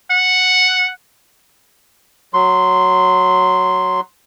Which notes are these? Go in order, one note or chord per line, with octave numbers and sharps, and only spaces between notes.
F#5
F#3 C6